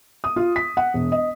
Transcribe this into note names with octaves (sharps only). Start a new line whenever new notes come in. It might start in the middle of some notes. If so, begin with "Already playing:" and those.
D#6
F4
B6
F#5
E1
D#5